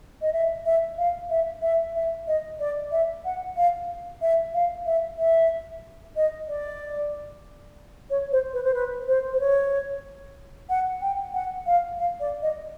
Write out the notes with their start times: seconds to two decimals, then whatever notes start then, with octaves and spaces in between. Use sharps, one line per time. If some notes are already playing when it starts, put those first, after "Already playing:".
0.22 D#5
0.33 E5
0.65 E5
0.98 F5
1.30 E5
1.62 E5
1.95 E5
2.27 D#5
2.60 D5
2.92 E5
3.25 F#5
3.57 F5
4.22 E5
4.54 F5
4.86 E5
5.18 E5
6.16 D#5
6.48 D5
8.10 C#5
8.32 C5
8.53 B4
8.64 C5
8.74 B4
9.08 C5
9.33 C5
9.40 C#5
10.69 F#5
11.02 G5
11.34 F#5
11.66 F5
11.99 F5
12.20 D5
12.42 D#5